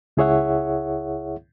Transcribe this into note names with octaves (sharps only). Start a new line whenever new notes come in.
C#2 E4 G#4 C#5 E5 F#5